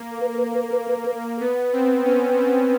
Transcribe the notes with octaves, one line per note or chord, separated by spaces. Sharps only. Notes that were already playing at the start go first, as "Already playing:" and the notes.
Already playing: A#3
A#4
B4
A#4
B4
A#4
B4
A#4
B4
A#4
B4
A#4
B4
A#4
B3 B4
C4
C#4
C4